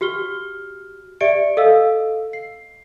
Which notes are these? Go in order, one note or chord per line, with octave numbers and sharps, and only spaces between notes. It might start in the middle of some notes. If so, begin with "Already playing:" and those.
F#4 G4 F6 G7
G4 D5 E5 C#7 D7
A4 D#5 F5 E6
C7